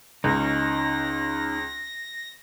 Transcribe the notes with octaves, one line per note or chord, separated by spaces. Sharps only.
C#2 C#4 D#4 A#6